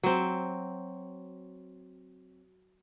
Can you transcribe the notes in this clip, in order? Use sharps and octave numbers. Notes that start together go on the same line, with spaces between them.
F#3 C4